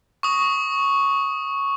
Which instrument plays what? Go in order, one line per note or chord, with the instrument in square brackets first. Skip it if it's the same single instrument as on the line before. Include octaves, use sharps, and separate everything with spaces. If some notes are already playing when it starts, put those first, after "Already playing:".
[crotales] C#6 D#6